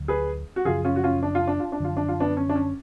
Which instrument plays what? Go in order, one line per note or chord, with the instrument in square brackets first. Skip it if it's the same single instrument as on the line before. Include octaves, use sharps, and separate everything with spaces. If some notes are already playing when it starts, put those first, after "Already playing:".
Already playing: [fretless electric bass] D2 D3 F#3
[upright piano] G#4 B4
F#4
[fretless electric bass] F#2 C#3 F3 [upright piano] F4 G#4
[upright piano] C#4 F4
F#4
C#4 F4
D4
F4
D4
F4
D4
[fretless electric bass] F#2 D3 F3 [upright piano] F4
[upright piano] D4
F4
B3 D4
C#4
D4
C#4